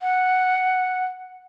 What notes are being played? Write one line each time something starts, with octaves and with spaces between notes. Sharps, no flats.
F#5